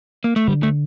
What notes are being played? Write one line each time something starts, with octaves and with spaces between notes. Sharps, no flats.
A#3
A3
D3 G3
A3